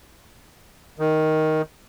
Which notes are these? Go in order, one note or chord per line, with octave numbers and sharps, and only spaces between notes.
D#3